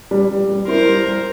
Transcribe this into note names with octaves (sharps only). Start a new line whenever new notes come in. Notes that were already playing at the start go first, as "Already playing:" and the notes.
G3
G3
G3
E4 A#4 C5
G3
G3